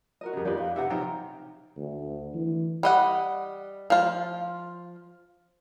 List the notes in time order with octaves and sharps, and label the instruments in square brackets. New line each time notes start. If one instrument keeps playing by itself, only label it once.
[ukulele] F#4 A#4 D#5
[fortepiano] F2 C#3 [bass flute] G4
[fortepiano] F2 B4 [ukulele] D#4 F4 D5 [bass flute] G4
[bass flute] F5
[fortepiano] C3 E5 [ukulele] D#4 B4 F#5 [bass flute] G4
[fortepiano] C3 F3 F#3 [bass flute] D#4 [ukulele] G5
[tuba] D2
E3
[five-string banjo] G3 D#5 F#5
F3 F4